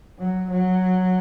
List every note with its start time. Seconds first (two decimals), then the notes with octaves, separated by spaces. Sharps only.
0.19 F#3
0.50 F#3